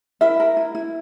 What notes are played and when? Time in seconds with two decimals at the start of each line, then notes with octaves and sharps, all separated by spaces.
0.21 E4 A#4 E5
0.40 A#4
0.57 E4
0.75 E4